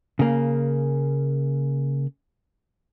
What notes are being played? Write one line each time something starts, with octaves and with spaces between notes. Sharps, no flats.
C#3 A#3